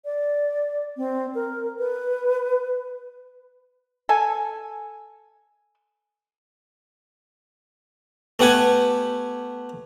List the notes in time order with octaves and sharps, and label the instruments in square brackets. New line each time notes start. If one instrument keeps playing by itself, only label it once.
[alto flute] D5
C4
A#4
B4
[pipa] A4 G#5
[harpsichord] A3 B3 G4 F#5 G#5